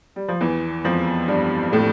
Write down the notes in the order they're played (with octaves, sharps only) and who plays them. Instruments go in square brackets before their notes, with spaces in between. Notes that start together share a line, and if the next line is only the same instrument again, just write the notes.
[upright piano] G3
F3
E2 E3
F2 F3
G2 G3
A2 A3